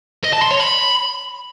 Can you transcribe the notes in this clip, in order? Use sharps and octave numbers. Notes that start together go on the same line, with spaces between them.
D#5
A5
C6
C#5
B5